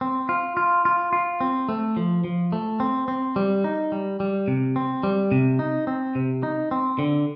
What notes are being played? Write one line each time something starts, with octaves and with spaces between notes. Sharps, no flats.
C4
F4
F4
F4
F4
C4
A3
F3
F3
A3
C4
C4
G3
D#4
G3
G3
C3
C4
G3
C3
D#4
C4
C3
D#4
C4
D3